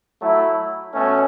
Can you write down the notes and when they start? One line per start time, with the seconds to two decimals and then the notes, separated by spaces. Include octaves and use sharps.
0.21 F#3 A3 E4
0.94 B2 A3 C#4